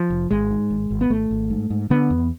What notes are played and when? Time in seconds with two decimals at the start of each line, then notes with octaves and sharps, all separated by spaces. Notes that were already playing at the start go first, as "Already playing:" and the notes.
Already playing: F3
0.10 F1
0.30 G#1 G#3
0.51 G#2
0.71 G#1
0.91 G#1
1.01 B3
1.10 G#1 A3
1.31 G#1
1.50 G#2
1.70 G#2
1.90 D3 B3
2.10 E2